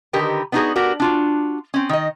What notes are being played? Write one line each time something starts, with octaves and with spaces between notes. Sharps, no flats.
D3 D#3 G4 A#4 B4
B3 D4 D#4 F4 F#4 G#4
B3 D4 F#4 G4 A#4
D4 F4 F#4
C4 C#4
D#3 D#5